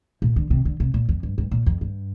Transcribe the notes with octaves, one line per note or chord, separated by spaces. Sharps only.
A#2
D3
C3
D3
C3
A#2
F2
G2
G2
A#2
F2
G2